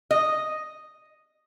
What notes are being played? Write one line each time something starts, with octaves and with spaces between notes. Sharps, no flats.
D#5